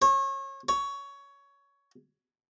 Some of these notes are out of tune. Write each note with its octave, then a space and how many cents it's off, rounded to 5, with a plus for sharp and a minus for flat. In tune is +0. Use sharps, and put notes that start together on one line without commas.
C#5 -30
C#5 +15